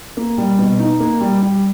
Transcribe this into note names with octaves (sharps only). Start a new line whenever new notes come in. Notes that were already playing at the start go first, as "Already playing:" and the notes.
A#3
G3
B2
D#4
A#3
G3
G3